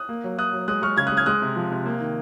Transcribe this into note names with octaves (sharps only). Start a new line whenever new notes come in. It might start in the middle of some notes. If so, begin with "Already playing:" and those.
Already playing: D#6 F#6
A#3
F#3
F#3 D#6 F#6
F#3
G#3 D#6 F#6
G#3 C#6 F6
C#3 F6 G#6
D#6 F#6
G#3
F6 G#6
G#3 D#6 F#6
C3
F3
C3
A#3
D#3